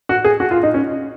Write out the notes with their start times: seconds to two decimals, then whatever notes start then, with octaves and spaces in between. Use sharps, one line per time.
0.09 F#4
0.25 G#4
0.40 F#4
0.51 F4
0.63 D#4
0.74 C#4